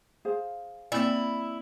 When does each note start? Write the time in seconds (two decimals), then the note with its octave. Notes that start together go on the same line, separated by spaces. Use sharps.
0.25 G#4 C5 F5
0.92 A#3 C4 E4 D5 B5 E6